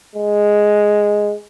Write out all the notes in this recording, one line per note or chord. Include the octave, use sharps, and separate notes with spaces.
G#3